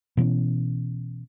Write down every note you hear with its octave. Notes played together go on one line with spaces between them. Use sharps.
B2 E3 C4 C#4